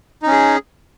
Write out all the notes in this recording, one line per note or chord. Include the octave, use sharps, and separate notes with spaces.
C#4 D#4 G#4